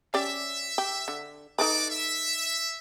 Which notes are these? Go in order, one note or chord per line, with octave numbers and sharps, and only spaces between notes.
C#4 G4 D5 E5
G4
D3
D#4 F#4 A4 B4 D5 D6
E5